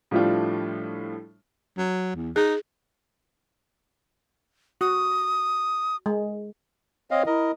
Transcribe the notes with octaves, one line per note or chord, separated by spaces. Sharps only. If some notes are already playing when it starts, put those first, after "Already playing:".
A2 F3 G3 A3 D4 F4
F#3
E2
D#4 G#4
F#4 D#6
G#3
C4 C#5 D#5 F5
E4 A#4 D#5